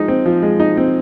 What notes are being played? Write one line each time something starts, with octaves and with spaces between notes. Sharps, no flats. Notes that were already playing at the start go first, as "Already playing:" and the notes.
Already playing: F3 G#3 D#4
C4
F3
G#3
D#4
C4